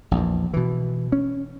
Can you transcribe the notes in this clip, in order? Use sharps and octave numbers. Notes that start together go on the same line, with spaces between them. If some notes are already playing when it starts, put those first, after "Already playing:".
A#1 E2
B2 E3
C#4